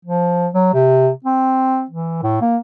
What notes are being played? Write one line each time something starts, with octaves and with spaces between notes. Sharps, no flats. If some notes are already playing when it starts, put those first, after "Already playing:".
F3
F#3
C3
C4
E3
A2
A#3